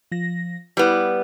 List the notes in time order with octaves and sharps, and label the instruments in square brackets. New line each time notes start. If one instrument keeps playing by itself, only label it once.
[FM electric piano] F3 A#6
[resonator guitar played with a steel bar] G3 B3 [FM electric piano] E4 B4